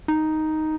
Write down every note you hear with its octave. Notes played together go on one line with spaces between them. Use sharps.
D#4